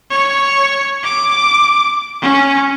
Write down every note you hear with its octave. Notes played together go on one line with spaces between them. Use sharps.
C#5
D6
C#4